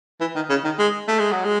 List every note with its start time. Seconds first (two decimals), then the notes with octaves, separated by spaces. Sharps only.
0.21 E3
0.35 D#3
0.50 C#3
0.64 D#3
0.79 G#3
1.08 A3
1.19 G#3
1.32 F#3
1.45 G#3